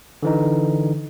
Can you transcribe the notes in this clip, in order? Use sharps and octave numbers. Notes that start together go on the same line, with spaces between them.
D3 E3 D#4